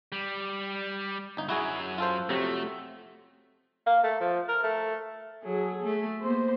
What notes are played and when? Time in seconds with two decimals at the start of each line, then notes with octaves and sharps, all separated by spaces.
0.12 G3
1.37 G1 D#4
1.49 F#2 F#3 E4 F#4 G#4
1.98 F4 A4 C5
2.29 F2 C3 F#3 A3
3.86 A#3
4.03 A3
4.20 F3
4.48 A#4
4.63 A3
5.44 F#3 G#4 A4
5.83 A3
6.21 A#3 B3 C5